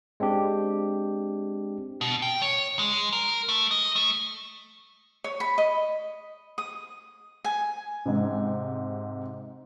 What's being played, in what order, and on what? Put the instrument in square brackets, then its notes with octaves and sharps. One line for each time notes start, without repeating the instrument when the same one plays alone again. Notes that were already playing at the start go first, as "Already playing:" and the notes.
[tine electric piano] G#3 C4 D4 G4
[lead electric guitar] B2
G5
C#5
G#3
A#4
A3
D#5
A3
[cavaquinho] C#5
B5
D#5
D#6
G#5
[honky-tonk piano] G#2 C3